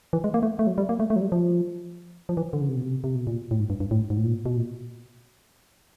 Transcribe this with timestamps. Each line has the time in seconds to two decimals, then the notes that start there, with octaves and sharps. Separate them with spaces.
0.13 E3
0.24 G#3
0.34 A#3
0.43 A3
0.59 A3
0.67 F#3
0.78 G3
0.89 A#3
1.00 A3
1.10 A3
1.16 F#3
1.21 G3
1.32 F3
2.29 F3
2.37 E3
2.53 D3
2.61 C#3
2.69 C3
2.77 B2
2.83 C3
3.04 C3
3.15 B2
3.27 A#2
3.51 A2
3.59 G#2
3.70 G2
3.80 G2
3.91 A2
4.10 G#2
4.17 A2
4.24 A#2
4.46 B2
4.57 A#2